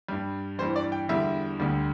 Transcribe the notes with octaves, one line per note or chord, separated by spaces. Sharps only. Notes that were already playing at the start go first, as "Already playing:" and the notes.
G2 G3
G2 E3 G3 C5
D5
G5
E2 D3 G3 E5
D2 D3 G3